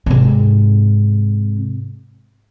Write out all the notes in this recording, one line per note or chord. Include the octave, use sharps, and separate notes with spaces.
G#2 C3